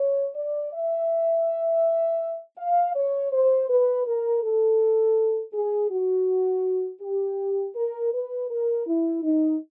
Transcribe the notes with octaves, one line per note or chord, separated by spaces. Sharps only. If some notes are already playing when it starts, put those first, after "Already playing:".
Already playing: C#5
D5
E5
F5
C#5
C5
B4
A#4
A4
G#4
F#4
G4
A#4
B4
A#4
E4
D#4